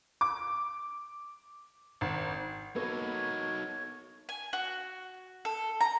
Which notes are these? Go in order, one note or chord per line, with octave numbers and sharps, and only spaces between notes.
D6
G#1
A#3 B3 D#4 F#4 A4 C#5
G#5
F#4
A4
A#5